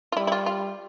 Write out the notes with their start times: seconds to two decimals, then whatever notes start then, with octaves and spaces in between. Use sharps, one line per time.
0.12 F4
0.17 G3 E4
0.27 E4
0.32 F4
0.46 F4